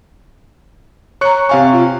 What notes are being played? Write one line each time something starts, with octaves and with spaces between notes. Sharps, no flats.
C#5 A#5 C#6 F#6 C#7
C3 F5 G#5 C#6
F4